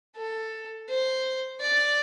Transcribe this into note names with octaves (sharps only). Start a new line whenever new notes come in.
A4
C5
D5